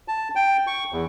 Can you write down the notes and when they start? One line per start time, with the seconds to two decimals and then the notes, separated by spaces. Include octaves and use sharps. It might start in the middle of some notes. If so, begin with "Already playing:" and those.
0.08 A5
0.36 G5
0.67 C#6
0.92 E2